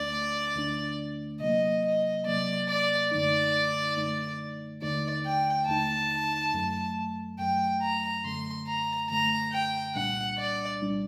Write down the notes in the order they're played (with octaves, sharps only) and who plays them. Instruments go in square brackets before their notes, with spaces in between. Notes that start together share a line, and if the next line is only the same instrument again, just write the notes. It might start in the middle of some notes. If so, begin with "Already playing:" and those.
Already playing: [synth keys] D2 D3 A3 D4 [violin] D5
[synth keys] D2 D3 A3 D4
[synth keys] C3 F#3 A#3 [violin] D#5
[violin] D#5
[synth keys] C3 F#3 A#3 [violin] D5
[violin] D5
[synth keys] F#2 D3 A3 D#4 [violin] D5
[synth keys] F#2 D3 A3 D#4
[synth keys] D#2 D3 A3 D#4 [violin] D5
[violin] G5
[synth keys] D#2 D3 A3 D#4 [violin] A5
[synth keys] F#2 F#3 A3
[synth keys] F#2 F#3 A3 [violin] G5
[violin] A#5
[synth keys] F#2 D3 A3 [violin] C6
[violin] A#5
[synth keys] F#2 D3 A3 [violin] A#5
[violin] G5
[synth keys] C2 A#2 G3 D4 [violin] F#5
[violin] D5
[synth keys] C2 A#2 G3 D4